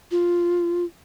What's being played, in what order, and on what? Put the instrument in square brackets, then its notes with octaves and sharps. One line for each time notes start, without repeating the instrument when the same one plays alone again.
[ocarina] F4